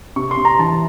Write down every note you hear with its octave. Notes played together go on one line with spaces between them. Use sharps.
C3 C#6
C6
C3
A#5
E3 A5